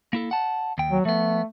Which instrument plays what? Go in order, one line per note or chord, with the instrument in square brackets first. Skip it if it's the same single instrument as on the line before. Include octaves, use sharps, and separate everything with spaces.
[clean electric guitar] A#3 E4 A4
F#5 A5
D#2 G5
[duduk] F#3
[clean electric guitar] F3 B3 [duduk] A3